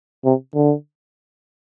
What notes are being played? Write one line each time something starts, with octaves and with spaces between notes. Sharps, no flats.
C3
D3